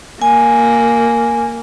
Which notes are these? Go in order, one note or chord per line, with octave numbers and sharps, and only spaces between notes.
A#3 G#5